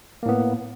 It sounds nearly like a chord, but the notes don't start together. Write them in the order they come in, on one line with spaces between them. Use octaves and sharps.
A#3 A2 B3